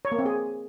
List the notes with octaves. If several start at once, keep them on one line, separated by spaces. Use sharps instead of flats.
C#5
A#3
C4
G#4